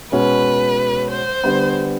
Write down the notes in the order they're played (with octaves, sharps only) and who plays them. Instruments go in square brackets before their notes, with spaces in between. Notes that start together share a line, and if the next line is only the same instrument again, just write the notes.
[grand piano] B2 G#3 C#4 [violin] B4
[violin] C5
[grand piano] D3 G3 B3